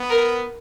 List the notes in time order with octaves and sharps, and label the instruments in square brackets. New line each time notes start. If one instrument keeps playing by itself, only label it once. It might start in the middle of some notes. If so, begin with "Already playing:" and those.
Already playing: [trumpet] B3
[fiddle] A#4